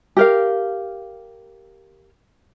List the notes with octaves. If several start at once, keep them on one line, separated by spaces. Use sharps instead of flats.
G4 A#4 F5